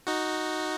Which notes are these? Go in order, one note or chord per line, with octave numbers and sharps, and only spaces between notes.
D#4 F#4